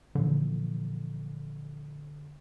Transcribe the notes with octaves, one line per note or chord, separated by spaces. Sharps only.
A#2 D3 E3 F3